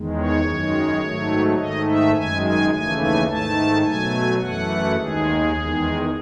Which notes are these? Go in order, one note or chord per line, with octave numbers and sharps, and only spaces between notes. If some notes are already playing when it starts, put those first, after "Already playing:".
Already playing: E2 D#3 G#3
C#5
F#2 D#3 G#3
G#2 D#3 F#3 A3
G#2 D#3 A3 D#5
E5
F#2 D#3 G#3 G#5
G#5
D#2 C#3 E3 A3 G#5
G#5
G#2 D#3 A3 A5
B2 F#3 A3 G#5
F#2 E3 A3 F#5
D#2 D#3 G#3 G#4
E2 D#3 G#3